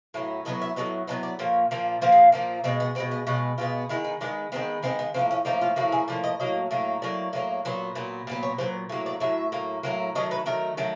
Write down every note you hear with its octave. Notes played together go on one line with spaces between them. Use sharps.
A2 F#3 B3
A2 F#3 B3 D#5
E5
A2 F#3 B3 D#5
A2 F#3 B3 D#5
D5
A#2 F3 A#3 C#5
A#2 F3 A#3
A#2 F3 A#3 C5
G#4
A#2 F3 A#3
B2 G#3 B3 C4
B3
B2 G#3 B3 C4
B3
B2 G#3 B3 C#4
B2 G#3 B3 F4
D#3 G#3 B3 E4
D#4
D#3 G#3 B3 D4
D#3 G#3 B3 C4
D#3 G#3 B3 C4
B3
A2 F3 A#3 C4
C#4
A2 F3 A#3 D#4
F4
A2 F3 A#3 F#4
G#4
A2 F3 A#3 D5
D#5
A2 F#3 A#3 D#5
A2 F#3 A#3
A2 F#3 A#3 D5
A2 F#3 A#3
A#2 F#3 B3
A#2 F#3 B3
A#2 F#3 B3
C#5
A#2 F#3 B3 C5
A2 F#3 A#3
D5
A2 F#3 E5
A2 F#3 A#3
A2 F#3 A#3
D#3 F#3 A3 D#5
B4
D#3 F#3 A3 A#4
D#3 F#3 A3